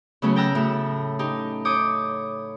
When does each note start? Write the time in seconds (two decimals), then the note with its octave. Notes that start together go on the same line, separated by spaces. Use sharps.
0.22 C#3 F#3 A3 B3 C#4
0.36 G5 A5 A#5 E6 F#6
0.55 A2 C#3
1.19 D#4 G4
1.65 C#5 D6 D#6 G6